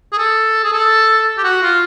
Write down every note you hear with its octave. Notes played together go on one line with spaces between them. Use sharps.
G#4
A4
G#4
A4
G4
F#4
F4